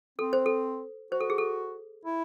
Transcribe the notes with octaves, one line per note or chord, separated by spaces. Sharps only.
C4 A4
C5
A4
F#4 C5
A4
G#4
A4
E4